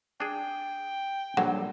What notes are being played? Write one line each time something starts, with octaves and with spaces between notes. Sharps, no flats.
D4 G#4 G5
A#1 D3 F#3 G3 F#5